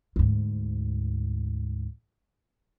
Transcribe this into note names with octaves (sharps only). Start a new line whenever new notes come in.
D2 G#2